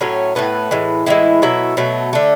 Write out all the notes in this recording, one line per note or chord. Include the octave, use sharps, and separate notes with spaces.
A2 F#3 A3 C#4 C#5
A2 F#3 A3 B3 B4
A2 E3 G#3
A2 E3 G#3 E4 E5
B2 F#3 A3 E4 E5
B2 F#3 A3
D3 A3